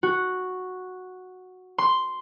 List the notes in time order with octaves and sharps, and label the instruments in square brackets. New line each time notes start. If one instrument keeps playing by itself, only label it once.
[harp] F#4
C6